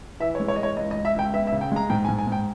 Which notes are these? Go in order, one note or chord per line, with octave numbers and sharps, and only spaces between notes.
E3 E5
C#5
G#3
C#5
E3 D#5
C#5
C#2 D#5
D#5
C#2
E5
C#2 G5
B3 E5
E5
C#3
G5
G#3 A#5
G#2 G5
G#5
G#2
G#5
G#2 G5